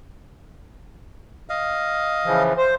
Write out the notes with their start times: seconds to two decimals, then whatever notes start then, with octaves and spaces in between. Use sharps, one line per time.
1.49 D#5 F5
2.25 C#3 E3 F3
2.57 C5